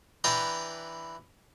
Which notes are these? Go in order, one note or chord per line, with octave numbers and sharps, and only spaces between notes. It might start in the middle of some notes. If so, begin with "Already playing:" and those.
E3 D4 B4 G5 A#5 C6